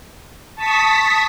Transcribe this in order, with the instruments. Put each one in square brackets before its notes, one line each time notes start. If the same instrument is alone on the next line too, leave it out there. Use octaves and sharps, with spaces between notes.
[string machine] A5 C#6 D#6 B6